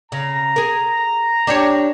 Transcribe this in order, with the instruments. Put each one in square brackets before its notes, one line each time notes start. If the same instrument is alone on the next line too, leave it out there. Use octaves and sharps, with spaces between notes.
[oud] C#3 [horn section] A#5
[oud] G#4 A#4
D4 G4 C#5